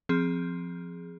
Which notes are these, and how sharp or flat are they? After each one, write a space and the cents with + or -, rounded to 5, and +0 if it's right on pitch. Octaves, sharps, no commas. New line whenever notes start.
F3 +0 C4 +0 G#4 +0